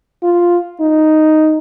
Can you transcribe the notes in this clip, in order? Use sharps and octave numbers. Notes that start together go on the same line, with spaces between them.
F4
D#4